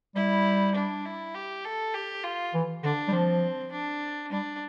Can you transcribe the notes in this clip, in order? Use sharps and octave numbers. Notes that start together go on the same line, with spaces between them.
G3 E4
D4
E4
G4
A4
G4
F4
E3
D3 D4
G3
F3 C4
D4
G3 D4